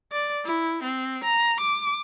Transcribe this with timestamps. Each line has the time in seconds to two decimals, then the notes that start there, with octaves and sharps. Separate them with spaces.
0.12 D5
0.45 E4
0.83 C4
1.25 A#5
1.61 D6